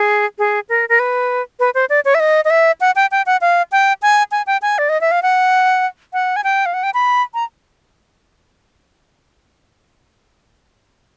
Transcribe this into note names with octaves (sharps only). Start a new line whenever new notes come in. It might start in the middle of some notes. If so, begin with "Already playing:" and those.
Already playing: G#4
G#4
A#4
A#4
B4
B4
C5
D5
C#5
E5
D#5
D#5
E5
F#5
G5
G5
F#5
F5
G5
G#5
G#5
G5
G#5
D5
D#5
E5
F5
F#5
F#5
G#5
G5
F5
F#5
G5
B5
A#5